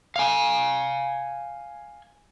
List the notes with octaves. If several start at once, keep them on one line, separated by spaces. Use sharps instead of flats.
F5 G#5